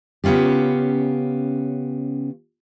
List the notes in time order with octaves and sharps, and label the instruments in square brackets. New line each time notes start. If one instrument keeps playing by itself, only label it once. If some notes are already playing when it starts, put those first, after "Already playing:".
[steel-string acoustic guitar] C#3 B3 C#4 F4 G4